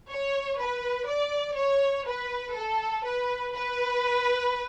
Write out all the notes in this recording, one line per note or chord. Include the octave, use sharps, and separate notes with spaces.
C#5
B4
D5
C#5
B4
A4
B4
B4